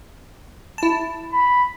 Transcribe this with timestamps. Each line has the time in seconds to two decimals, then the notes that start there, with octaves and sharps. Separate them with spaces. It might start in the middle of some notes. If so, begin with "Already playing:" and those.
0.78 E4 A5
1.32 B5